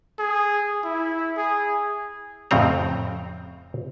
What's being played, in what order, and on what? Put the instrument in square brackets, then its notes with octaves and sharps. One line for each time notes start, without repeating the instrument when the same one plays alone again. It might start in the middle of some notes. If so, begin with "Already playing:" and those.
[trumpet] G#4
E4
G#4
[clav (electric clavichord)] F2 A2 C#3 C4 A#5